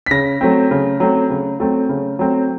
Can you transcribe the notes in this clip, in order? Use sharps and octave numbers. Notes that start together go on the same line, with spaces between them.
B6
C#3 A#6
F#3 A3 C4
C#3
F#3 A3 C4
C#3
F#3 A3 C4
C#3
F#3 A3 C4